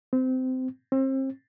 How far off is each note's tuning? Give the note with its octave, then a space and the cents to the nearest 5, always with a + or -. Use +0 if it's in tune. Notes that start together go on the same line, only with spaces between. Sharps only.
C4 -20
C4 +35